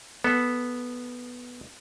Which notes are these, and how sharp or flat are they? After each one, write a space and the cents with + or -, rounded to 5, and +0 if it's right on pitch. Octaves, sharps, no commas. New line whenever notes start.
B3 -5 A4 -5